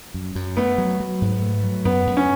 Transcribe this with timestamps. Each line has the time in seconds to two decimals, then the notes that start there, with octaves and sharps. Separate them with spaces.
0.14 F#2
0.35 F#2
0.57 A3 B3
0.78 F#3
1.00 F#3
1.21 G#2
1.42 A3
1.64 F#3
1.85 F#2 B3
2.07 F#2
2.17 C#4